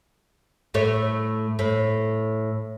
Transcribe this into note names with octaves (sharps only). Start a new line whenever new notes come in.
A2 A3 C#5
A2